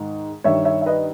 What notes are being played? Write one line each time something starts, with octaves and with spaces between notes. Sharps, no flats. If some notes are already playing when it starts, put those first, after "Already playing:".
Already playing: G#2 D#3
G2 D#3 C#5 E5
C#5 E5
E5
B4 D#5